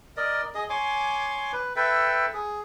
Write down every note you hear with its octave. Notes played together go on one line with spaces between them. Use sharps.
A#4 D5 D#5
G#4 D#5
C#5 G#5 C6 D6
B4
A4 B4 E5 G5
G#4